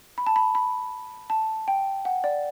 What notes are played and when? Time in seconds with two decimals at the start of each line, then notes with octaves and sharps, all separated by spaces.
0.18 B5
0.26 A5
0.36 B5
0.55 B5
1.30 A5
1.68 G5
2.05 F#5
2.24 D5